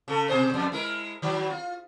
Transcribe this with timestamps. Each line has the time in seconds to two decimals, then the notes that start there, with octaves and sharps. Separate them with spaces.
0.08 C#3 A4
0.29 B2 G#4 C5
0.54 F2
0.72 G#3 E4 A#4
1.22 D#3 F#3
1.50 F4